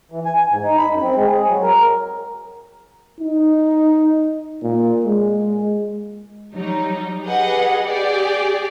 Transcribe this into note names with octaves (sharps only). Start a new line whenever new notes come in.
E3
G#5
G#5
G#2
D#4
B5
F#2
C4
G#3
G#4
F#3
A#4
D#4
A#2
G#3
F#3 G3 D#4
G4 G#4 B4 D#5 F#5
G4 G#4 D5